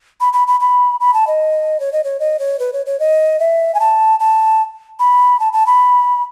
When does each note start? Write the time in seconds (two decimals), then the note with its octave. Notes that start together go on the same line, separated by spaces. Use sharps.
0.21 B5
0.33 B5
0.47 B5
0.60 B5
1.00 B5
1.14 A5
1.27 D#5
1.80 C#5
1.93 D#5
2.04 C#5
2.20 D#5
2.39 C#5
2.59 B4
2.73 C#5
2.86 C#5
3.00 D#5
3.40 E5
3.74 G#5
3.80 A5
4.20 A5
4.99 B5
5.40 A5
5.53 A5
5.66 B5